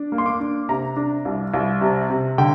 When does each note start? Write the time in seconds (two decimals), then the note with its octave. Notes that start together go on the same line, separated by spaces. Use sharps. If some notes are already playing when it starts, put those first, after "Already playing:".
Already playing: D4
0.12 A#3
0.18 C6
0.26 D6
0.40 D4
0.69 C3 A#5
0.96 D4
1.25 C2
1.54 C2
1.81 C3
2.10 C3
2.38 D3 G5